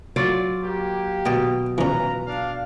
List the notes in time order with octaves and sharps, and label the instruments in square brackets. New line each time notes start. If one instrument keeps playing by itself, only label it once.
[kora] F#3 F4 D5
[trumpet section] A#3 G4
[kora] B2 [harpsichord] D#5 G5
[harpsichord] E3 C#4 [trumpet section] F4 B4 A#5
[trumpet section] D4 F5